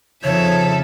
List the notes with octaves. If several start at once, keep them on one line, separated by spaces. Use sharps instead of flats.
F2 C#3 F3 D#4 A4 C#5 E5